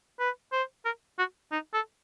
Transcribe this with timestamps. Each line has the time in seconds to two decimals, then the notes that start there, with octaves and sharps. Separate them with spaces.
0.20 B4
0.52 C5
0.85 A#4
1.19 F#4
1.52 D#4
1.74 A4